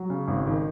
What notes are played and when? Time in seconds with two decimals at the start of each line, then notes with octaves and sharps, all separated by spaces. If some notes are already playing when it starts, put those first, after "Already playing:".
Already playing: F#3
0.10 C#3
0.28 G#1
0.47 D#3